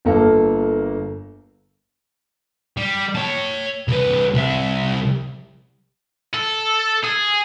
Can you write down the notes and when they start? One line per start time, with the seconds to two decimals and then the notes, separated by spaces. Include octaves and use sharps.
0.05 G1 A#3 A4 A#4
2.77 G3
3.16 C#5 A5
3.88 C2 B4
4.34 C2 E5
6.34 A4
7.04 G#4